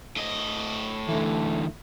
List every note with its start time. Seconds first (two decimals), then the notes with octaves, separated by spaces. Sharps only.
0.16 A2 D#5
1.09 D3 E3 A3